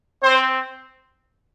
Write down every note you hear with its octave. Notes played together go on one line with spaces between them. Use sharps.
C4 C5